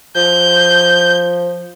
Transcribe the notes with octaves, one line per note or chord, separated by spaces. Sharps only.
F3 G6